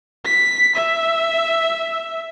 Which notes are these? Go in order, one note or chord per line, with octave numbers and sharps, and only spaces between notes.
B6
E5